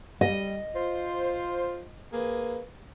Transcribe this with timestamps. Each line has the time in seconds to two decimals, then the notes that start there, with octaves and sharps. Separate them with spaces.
0.21 G3 D#5
0.75 F4 C5
2.13 A#3 G#4 B4